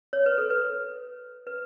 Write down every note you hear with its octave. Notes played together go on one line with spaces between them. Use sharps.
C#5
B4
A4
B4
B4